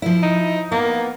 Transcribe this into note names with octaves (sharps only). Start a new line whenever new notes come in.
F3 E4
D#4
A#3 B3